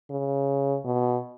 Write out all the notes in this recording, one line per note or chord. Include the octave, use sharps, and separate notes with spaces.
C#3
B2